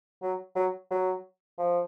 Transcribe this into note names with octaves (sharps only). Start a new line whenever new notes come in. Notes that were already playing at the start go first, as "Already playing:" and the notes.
F#3
F#3
F#3
F3